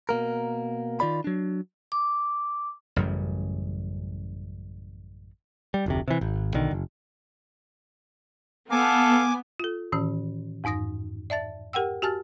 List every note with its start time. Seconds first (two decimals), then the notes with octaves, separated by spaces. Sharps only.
0.09 B2 A#3 A#4
1.00 D#3 F4 D5 B5
1.24 F#3 D4
1.92 D6
2.96 A1 F#2 C#3 G3
5.74 G3
5.86 F1 D2 C3
6.08 C3 E3
6.21 G#1
6.54 B1 D3 D#3
6.71 F#1
8.71 B3 A4 F5 G#5 D6
9.60 F4 A4
9.92 A2 D#3 E3 C#4
10.64 F2 G#2 D#4 D#6 A#6
11.30 D5 E5 A5 A6
11.73 G4 A#4 F#5 G5 E6
12.02 F#4 G4 G#5 A5 F6 A6